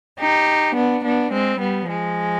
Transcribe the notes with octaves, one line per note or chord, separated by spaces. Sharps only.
D#4 G4
B3 D4
B3 D4
G#3 C4
G3 B3
F3 G#3